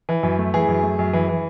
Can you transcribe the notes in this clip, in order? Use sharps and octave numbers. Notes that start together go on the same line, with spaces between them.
E3
F#2
A3
E3 G#4
F#2
A3
F#2
E3
E3